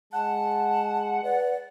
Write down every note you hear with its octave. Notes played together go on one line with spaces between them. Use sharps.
G#3 F#5 A5
B4 D5